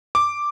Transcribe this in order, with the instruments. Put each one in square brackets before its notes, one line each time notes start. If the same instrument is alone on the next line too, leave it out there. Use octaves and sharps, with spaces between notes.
[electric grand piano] D6